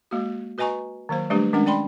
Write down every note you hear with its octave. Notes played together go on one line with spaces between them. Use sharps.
G#3 A#3 F#4
F#4 B4 D#5 G#5 A#5 C#6
D#3 F#3 A#3 C5
F#3 G3 A3 D4 G4 B4
D#3 G#3 C#4 D4 A#4 F#5
D5 G5 B5 C6